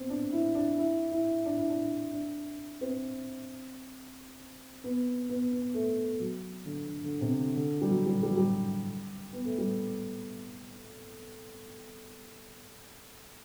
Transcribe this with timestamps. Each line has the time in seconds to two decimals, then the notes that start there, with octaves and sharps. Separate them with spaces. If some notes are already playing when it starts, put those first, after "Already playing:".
Already playing: B3 C4
0.10 D4
0.32 E4
0.55 D4
0.78 E4
1.12 E4
1.46 D4
1.58 E4
1.70 D4
2.14 D4
2.81 C4
4.84 B3
5.29 B3
5.52 B3
5.74 A3
6.20 F#3
6.65 D3
6.88 D3
7.04 D3
7.21 C3
7.38 D3
7.55 D3
7.81 G3
7.89 F#3
8.06 G3
8.23 G3
8.30 F#3
8.37 G3
9.33 B3
9.45 A3
9.58 G3